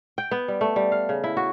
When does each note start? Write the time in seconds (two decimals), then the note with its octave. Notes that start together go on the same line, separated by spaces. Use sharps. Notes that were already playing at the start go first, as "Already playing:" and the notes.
0.18 G5
0.31 B3
0.48 G3
0.61 A3
0.76 G3
0.92 F5
1.09 C#3
1.24 E4
1.37 F#4